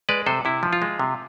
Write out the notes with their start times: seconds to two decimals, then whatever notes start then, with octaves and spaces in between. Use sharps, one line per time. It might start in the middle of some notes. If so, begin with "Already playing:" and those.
0.09 G#3 B4 D5
0.26 C3 A4 C5
0.45 C3 E4
0.63 F3
0.73 F4
0.82 G#3
0.99 C3